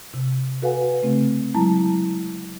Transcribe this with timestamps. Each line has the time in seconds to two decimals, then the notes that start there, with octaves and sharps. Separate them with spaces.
0.14 C3
0.62 F#4 A4 B4 F5 F#5 G#5
1.02 C#3 A3 C4
1.54 F#3 G#3 E4 A5 A#5